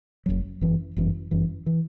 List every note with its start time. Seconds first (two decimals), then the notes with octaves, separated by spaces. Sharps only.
0.26 F#1 F#2 F#3
0.61 G1 F#2 E3
0.97 G1 F#2 E3
1.31 G1 F#2 E3
1.66 E3